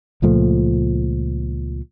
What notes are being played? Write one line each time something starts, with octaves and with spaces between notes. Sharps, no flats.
C#2 A#2 F3 A3